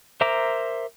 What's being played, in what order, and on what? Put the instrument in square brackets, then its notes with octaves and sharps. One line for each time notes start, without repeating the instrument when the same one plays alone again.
[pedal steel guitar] A#4 C5 E5 A#5 D6